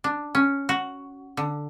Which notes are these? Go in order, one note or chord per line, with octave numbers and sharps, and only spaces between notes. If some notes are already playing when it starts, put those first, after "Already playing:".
D4
C#4
F#4
D3